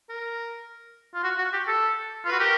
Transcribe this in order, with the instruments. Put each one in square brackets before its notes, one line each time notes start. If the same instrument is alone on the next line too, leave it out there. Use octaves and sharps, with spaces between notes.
[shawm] A#4
[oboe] F4
F#4
F#4
G4
A4
F4
[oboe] F#4 [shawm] B4
[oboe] G4 [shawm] A#4